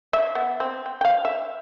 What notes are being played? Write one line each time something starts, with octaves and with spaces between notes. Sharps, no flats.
E5
B3
C4
G5
F5 G5
E5